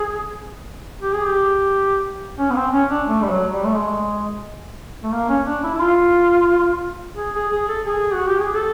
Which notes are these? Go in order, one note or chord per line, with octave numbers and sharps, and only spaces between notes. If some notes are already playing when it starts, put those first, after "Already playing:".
Already playing: G#4
G4
G#4
G4
C#4
B3
C4
C#4
D4
A3
G3
F#3
G3
A3
G#3
A3
A#3
C#4
D4
E4
E4
F4
G#4
G#4
G#4
A4
G#4
F#4
G4
G#4
A4